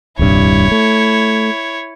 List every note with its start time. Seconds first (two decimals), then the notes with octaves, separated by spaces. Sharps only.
0.19 D#1 C2 G2 E4 C#5
0.71 A3